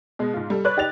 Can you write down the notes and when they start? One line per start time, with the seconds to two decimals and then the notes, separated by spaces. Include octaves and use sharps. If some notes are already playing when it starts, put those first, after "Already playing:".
0.19 B2 G#3
0.34 G#2 F4
0.50 G3 A4
0.65 B4 C#5 D5 B5 F#6
0.77 D#4 G4 D5 A6 F7